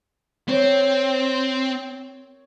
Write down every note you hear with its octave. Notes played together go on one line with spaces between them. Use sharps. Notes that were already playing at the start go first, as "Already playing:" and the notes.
C4 C#5